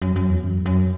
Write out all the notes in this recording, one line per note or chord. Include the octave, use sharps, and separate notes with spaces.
F#2
F#2
E2
F#2
F#2